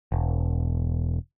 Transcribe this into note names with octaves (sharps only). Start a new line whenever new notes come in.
E1